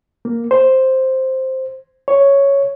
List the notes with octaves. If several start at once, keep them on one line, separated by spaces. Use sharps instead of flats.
A#3
C5
C#5